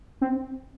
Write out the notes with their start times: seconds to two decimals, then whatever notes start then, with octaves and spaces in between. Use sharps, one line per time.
0.21 C4